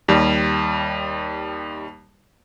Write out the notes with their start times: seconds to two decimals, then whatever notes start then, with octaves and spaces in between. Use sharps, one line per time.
0.08 D#2 G3